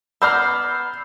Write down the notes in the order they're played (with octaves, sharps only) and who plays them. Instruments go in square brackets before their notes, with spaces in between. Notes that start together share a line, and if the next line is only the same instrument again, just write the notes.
[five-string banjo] B3 D5 A#5 [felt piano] B5 F6 [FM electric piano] E6 G6 C7